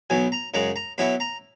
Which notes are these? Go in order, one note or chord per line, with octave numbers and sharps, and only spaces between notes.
B1 B2 F#3 G#5
A#5
F#2 C#3 G#3 A#5
A#5
B2 F#3 C#4 E4 B5
A#5